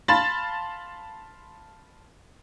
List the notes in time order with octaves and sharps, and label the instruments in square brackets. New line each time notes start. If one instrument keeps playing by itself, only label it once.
[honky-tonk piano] F5 A5 B5 C6 A6